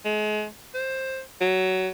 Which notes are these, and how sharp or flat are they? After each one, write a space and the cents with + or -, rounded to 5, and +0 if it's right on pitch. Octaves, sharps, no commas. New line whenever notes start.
G#3 +35
C5 +15
F#3 +15